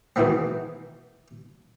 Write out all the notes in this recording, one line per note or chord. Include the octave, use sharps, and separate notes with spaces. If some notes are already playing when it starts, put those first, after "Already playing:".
G#2 B2 D#3 E3 B3 C4